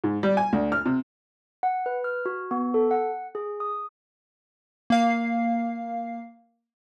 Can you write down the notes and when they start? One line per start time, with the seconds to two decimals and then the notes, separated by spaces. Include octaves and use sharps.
0.04 G#2
0.23 G3
0.37 G#5
0.53 D2
0.72 F6
0.86 C3
1.63 F#5
1.86 B4
2.04 F6
2.26 F#4
2.51 B3
2.74 A4
2.91 F#5
3.35 G#4
3.60 D#6
4.90 A#3 F5 C7